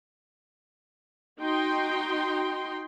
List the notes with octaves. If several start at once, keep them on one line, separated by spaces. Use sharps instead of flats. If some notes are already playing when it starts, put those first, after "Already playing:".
D#4 F#4 G5 C6